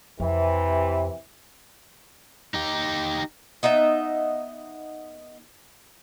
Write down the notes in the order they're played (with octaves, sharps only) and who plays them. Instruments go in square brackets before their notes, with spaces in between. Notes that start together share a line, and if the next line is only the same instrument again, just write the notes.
[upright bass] F2 [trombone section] C3 E3
[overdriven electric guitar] D#4 G4
[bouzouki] B3 D#4 D#5 E5